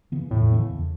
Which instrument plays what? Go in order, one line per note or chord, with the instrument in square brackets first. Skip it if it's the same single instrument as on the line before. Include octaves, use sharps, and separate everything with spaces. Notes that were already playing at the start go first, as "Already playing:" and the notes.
[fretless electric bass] C#3 E3 B3
[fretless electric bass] E2 [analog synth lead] A2
[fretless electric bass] C#3 E3 B3
E2